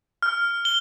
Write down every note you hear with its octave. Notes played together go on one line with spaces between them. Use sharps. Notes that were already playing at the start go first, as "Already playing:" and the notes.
F6
G7